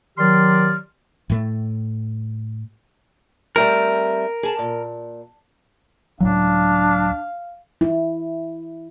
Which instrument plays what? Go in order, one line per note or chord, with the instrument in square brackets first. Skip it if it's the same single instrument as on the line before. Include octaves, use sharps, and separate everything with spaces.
[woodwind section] D#3 F#3 G4 D5 C6 F6
[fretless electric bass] A2 A3
[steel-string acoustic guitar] G3 A3 C4 [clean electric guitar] A#4
[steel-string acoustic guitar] G#4 A5
A#2
[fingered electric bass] C#2 A2 F#3 [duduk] D4 [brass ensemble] F5
[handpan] E4